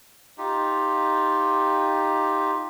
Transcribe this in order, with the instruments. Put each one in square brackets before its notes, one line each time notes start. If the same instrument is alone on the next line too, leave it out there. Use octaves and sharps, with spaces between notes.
[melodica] D#4 F4 G4